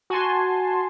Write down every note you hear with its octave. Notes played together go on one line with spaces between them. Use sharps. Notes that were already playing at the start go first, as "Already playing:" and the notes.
F#4 G#5 A5 C6